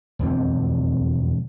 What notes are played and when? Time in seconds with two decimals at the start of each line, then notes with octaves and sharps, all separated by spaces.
0.19 E1 F2 D3 C4